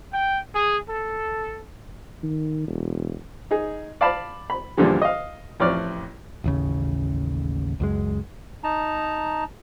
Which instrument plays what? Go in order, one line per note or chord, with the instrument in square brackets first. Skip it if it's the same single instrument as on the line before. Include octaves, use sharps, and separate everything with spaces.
[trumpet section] G5
G#4
A4
[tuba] D#3
E1
[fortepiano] D#4 G#4
D5 F5 A5 B5
B5
E2 G2 A#2 D3 F3 G3
D#5 F5
A1 F2 C#5 D5 F6
[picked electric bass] A1 D#2 C#3
C#2 F#2 G#3
[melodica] D#4 A5 A#5